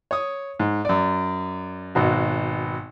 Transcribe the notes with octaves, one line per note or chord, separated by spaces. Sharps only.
C#5 D#6
G#2
F#2 D5
G#1 B2 F#4